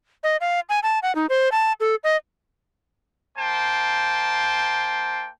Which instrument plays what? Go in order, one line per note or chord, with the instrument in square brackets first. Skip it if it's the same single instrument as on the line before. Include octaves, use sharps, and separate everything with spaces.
[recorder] D#5
F5
G#5
A5
F#5
D#4
C5
A5
A4
D#5
[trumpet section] A#3 C5 G5 A5